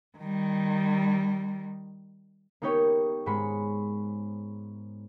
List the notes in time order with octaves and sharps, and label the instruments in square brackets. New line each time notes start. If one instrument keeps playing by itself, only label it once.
[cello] D#3 G3
[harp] A#3 B3 D#4 G4 C#5
G#2 G#3 B5 C#7